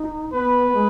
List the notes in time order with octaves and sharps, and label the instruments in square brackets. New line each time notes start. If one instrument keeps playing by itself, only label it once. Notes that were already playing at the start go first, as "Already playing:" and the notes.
Already playing: [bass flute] D#4
[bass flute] B3 [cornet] B4
[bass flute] G#3